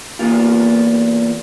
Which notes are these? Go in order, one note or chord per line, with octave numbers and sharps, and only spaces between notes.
E2 A#3 F4